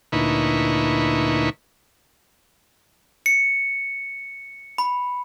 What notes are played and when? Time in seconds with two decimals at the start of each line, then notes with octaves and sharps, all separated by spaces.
0.12 D2 A#2 D#4 E4 B4 C#6
3.26 C#7
4.78 B5